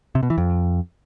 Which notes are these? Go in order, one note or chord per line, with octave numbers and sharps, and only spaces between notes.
C3
B2
E3
F2